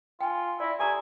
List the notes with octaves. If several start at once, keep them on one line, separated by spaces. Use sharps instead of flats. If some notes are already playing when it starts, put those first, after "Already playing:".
F4 G5 G#5
E4 D5 E5
G4 A4 G#5 A#5